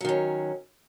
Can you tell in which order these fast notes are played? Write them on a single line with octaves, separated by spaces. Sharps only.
F#3 D#3 C#4